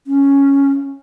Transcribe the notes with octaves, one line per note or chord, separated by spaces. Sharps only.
C#4